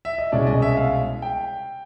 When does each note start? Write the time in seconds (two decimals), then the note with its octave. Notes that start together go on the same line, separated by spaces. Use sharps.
0.05 E5
0.18 D#5
0.32 C2 B2 G#3 C#4 D5
0.47 D#5
0.62 E5
0.77 F5
1.22 G5